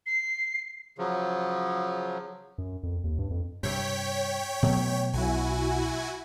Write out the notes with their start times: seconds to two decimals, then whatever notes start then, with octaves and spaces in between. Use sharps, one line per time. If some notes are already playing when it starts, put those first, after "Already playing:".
0.06 C7
0.98 C#3 F3 F#3
2.58 F#2
2.83 F2
3.04 D#2
3.19 G2
3.30 F2
3.63 G2 C3 C#5 G5 B6
4.63 B2 F#3 A3
5.13 B1 E4 F#4 G#5